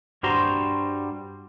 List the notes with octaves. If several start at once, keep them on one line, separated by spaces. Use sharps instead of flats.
G2 G3 F#4 C5 A#5 C6